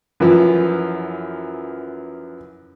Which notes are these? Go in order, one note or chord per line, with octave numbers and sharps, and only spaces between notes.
F#2 E3 F3